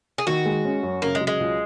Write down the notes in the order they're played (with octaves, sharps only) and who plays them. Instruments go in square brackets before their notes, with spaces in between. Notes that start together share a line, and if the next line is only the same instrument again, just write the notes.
[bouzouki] G#4
[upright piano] D#3 [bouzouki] F#4
[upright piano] G#3
C#4
F#2
[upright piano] C#3 [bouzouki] A#3
[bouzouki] G#3
[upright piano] F#3
[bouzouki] G#3
[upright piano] C#2